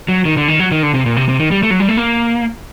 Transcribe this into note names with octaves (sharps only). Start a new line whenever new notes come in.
F#3
D#3
D3
D#3
F#3
D#3
D3
C3
A#2
C3
C3
D#3
G3
A3
F#3
G3
A3
A#3